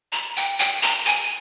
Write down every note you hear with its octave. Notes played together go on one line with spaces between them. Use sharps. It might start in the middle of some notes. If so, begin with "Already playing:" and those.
A#5
G5
G5
A#5
G#5